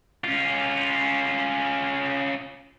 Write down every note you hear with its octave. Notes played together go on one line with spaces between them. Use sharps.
C#4 F4